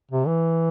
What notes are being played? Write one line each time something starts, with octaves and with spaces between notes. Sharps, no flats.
C3
E3